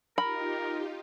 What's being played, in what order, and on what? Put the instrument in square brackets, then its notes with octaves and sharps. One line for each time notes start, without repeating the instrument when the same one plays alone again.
[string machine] D#4 F4 G4 [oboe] A#4 [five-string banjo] B5